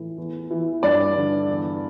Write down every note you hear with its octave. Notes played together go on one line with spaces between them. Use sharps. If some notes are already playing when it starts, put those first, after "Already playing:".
Already playing: A2 E3
E2
E3
G2 D5
D3
E2